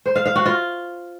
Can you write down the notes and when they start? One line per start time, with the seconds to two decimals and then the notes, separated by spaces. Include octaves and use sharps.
0.06 C5
0.16 F5
0.26 F5
0.36 F#4
0.46 F4